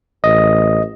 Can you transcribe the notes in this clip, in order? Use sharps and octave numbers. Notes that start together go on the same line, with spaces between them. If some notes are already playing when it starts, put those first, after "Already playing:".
A1 D#5